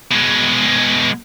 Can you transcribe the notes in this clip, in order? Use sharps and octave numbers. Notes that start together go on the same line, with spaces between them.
B2 G#3